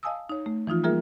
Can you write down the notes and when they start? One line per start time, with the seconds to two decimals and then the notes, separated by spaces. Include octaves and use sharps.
0.03 D#5 F5 G#5 A5 D#6 E6
0.29 D#4 C#5
0.46 A3
0.67 E3 F3 D#4 F4
0.84 G3 A#3 F4 G#4 A#4 E5